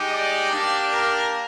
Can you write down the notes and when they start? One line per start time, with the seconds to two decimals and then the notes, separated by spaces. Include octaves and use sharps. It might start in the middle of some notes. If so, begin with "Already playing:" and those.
Already playing: G#3 D#4 G4
0.10 D5
0.51 A#3 D4 G4
0.92 A#4